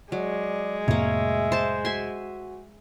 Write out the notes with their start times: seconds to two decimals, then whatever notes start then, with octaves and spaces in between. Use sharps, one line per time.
0.12 F#3 G#3 D5
0.88 F2 A2 C3 A#3 C#5 E5
1.52 C5 A5
1.85 F#4 E5 G#5 C6